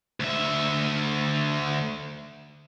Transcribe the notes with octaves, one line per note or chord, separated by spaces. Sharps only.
D2 E5